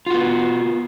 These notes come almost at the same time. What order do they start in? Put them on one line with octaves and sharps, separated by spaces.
F4 F#4 B3